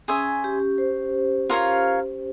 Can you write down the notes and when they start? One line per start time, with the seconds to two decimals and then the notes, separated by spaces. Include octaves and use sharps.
0.08 C#4 G#4 C5 E5 G#5
0.44 G4
0.78 C5
1.50 F4 A#4 C#5 F5